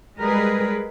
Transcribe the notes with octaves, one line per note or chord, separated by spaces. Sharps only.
G3 G#3 G#4 A#4 B4